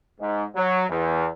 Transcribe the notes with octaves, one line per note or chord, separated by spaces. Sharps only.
G#2
F#3
E2